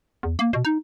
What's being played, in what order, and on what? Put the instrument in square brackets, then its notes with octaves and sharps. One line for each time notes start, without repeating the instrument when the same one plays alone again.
[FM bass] E2
A#3
B2
D#4